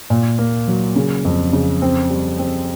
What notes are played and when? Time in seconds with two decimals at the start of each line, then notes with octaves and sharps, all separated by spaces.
0.10 A#2
0.38 A#3
0.68 F#3
0.96 C#3
1.25 F2
1.53 C#3
1.82 C4
2.10 G3
2.39 C4